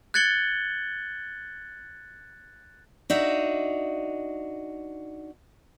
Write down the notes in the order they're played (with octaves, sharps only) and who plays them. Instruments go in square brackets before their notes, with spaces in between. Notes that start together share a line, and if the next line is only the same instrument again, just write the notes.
[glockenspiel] F#6 G#6 A6 C#7 F#7 G7
[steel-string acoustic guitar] D4 D#4 F#4 E5